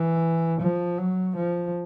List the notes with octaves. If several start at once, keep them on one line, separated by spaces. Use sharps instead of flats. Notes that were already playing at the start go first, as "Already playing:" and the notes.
Already playing: E3
F3
F#3
F3